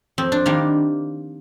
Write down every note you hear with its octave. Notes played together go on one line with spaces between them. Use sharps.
F2 C4
D4
D#3 G3 A#3 D4